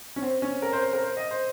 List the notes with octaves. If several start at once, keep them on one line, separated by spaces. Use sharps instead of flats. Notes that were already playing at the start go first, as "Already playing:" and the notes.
C#4
C4
C#4
A#4
C5
C5
A#4
C5
D#5
C5